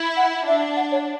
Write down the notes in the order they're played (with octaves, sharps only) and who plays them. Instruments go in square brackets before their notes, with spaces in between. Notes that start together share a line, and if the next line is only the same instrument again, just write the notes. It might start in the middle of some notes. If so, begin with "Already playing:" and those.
Already playing: [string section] E4
[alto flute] F#5
[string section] D4 [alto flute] E5
[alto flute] F#5
C#5